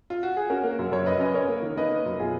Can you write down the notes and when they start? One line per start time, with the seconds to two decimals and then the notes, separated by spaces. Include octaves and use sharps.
0.10 F4
0.23 F#4
0.37 G#4
0.50 C#4 F#4 A#4
0.63 A#3
0.79 F#2
0.92 F#2 A#4 C#5
1.06 F#2 B4 D#5
1.20 C#4 B4 D#5
1.34 C#4 A#4 C#5
1.48 A#3
1.63 D#3
1.76 A#3 B4 D#5
1.91 A#3
2.06 F#2
2.19 B2 F4 G#4